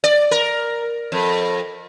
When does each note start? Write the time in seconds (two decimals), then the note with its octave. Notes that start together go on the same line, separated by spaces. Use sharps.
0.04 D5
0.31 A#4
1.12 F2